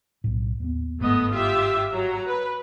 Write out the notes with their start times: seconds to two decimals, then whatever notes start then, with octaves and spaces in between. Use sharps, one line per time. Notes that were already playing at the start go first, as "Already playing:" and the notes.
0.24 B1 A2
0.60 D#2 B3
1.01 G1 G#2 A3 B3 D#5
1.32 F4 G4 E5
1.92 F#3 A#5
2.25 B4